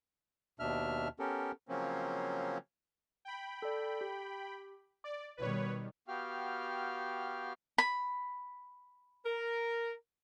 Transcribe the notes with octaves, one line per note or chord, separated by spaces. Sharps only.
D#2 B2 D4 E5 F6
B3 C#4 G4 A4 A#4
C#3 F3 F#3 A#3 C4 C#4
G5 B5
A4 D5
G4
D5 D6
B2 D#3 G3 B4 C#5
B3 F#4 G4 F5 G5 F6
B5
A#4